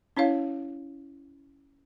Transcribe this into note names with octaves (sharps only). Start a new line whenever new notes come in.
C#4 E4 C#5 F5